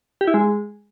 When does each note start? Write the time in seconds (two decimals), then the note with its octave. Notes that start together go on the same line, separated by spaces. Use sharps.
0.21 G4
0.28 E4
0.34 G#3